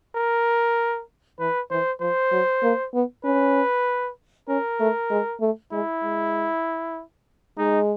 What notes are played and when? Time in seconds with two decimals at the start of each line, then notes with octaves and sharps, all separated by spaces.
0.15 A#4
1.39 E3 B4
1.70 E3 C5
2.00 F3 C5
2.32 F#3
2.63 A#3
2.94 B3
3.24 C#4 B4
4.48 C#4 A#4
4.80 A3
5.10 G#3
5.41 A3
5.72 G#3 E4
6.03 G#3
7.58 G#3 D#4